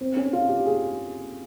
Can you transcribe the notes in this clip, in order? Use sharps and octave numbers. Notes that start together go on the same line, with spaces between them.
C4
C#4
F4
G4
G#4